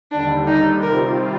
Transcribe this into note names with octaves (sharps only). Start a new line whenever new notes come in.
D#2 D3 G3 D4
D#4
C3 D#3 G3 C4 F4 A#4